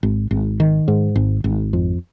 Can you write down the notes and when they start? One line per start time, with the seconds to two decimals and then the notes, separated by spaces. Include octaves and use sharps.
0.03 G#1
0.31 G#1
0.60 D#3
0.88 G#2
1.16 G#1
1.44 G#1
1.73 F2